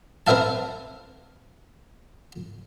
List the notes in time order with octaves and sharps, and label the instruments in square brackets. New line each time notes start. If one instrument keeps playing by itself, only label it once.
[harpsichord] C4 A#4 B4 E5 F5 A5